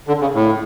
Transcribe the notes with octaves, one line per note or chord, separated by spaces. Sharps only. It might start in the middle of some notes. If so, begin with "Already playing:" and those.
D3
C#3
A2